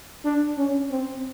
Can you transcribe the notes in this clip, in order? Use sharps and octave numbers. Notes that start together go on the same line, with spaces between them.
D4
C#4
C4